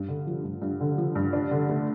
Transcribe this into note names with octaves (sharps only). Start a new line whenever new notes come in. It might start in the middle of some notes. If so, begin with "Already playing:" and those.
Already playing: G2
D3
F3
G2
G2
D3
F3
G2
D4
D3
A3